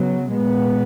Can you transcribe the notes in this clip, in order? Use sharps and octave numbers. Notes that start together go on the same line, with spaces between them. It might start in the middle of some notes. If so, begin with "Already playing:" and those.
Already playing: C#3 F#3 B3
A#2 G#3 B3